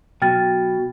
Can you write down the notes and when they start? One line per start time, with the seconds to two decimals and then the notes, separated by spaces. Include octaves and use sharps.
0.22 B2 F#3 G5 F6 A6